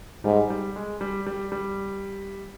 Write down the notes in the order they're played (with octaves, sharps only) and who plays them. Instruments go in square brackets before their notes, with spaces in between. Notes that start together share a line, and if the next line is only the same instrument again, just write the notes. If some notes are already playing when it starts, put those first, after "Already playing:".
[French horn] G#2 [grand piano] G3
[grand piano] G3
G#3
G3
G3
G3